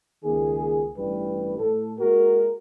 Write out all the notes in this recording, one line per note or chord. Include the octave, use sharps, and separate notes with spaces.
C#2 D#3 A#3 G#4
A1 G2 E3 G3 B4
A2 A4
G#3 A#3 F#4 A#4